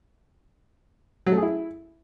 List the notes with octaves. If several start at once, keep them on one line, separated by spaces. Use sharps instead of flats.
F#3
A3
G#4
E4